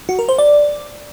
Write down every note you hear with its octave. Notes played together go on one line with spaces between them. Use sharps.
F#4
A#4
C5
D5